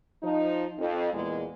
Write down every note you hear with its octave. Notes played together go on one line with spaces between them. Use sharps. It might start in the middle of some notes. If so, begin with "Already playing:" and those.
F3 D#4
F2
E2 A#2 G#3